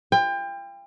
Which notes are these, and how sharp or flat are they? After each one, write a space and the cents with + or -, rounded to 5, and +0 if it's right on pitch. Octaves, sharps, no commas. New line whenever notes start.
F4 -40 G5 +30